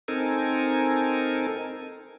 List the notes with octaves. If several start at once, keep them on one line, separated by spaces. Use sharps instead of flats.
C4 D#4 A4 A#4 G#5